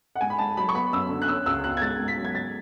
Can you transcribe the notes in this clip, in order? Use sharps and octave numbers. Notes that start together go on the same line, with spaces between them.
F#5
G#2 G#5
B5
G#2 A5
F#3 B5
C#6
B3 B5
F#2 E6
D3
F#6
C#4 E6
C#2 E6
B2 F#6
G#6
G#2 A6
G#2
B6
F#3
G#6
G#2 A6